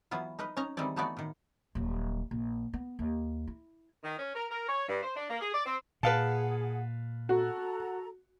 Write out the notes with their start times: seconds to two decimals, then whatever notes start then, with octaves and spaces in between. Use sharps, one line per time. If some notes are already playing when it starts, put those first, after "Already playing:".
0.11 E3 F#3 B3 F4
0.39 D#4 A#4 B4 D#5
0.57 C#4 D#4 A#5
0.77 D#3 E3 G3 G#3 C4 D5
0.96 E3 A3 B3 D#4 F#4 D5
1.17 A2 D#3
1.75 D#1 F#3
2.31 A#1
2.73 B3
2.99 D#2
3.47 E4
4.03 D#3
4.18 C#4
4.35 A#4
4.51 A#4
4.68 C#5
4.89 G2
5.03 C5
5.16 D4
5.30 A#3
5.41 G#4
5.54 D5
5.65 C4
6.03 A#2 G#4 B4 F5 F#5 A5
7.29 F#4 A4 A#5